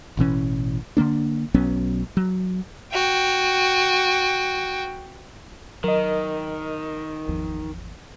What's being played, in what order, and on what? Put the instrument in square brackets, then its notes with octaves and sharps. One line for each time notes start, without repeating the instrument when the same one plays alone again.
[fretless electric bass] A1 B2 E3 C#4
D3 D#3 A#3 D4
B1 F#3 B3 C#4
F#3
[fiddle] F#4 G5
[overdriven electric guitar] D#3 [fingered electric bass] F#3 [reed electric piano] A#4 D#5
[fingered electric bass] G#1 E2 F3